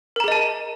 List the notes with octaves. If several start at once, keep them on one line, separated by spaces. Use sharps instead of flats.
G#4 A#4 D#5 A5 A#5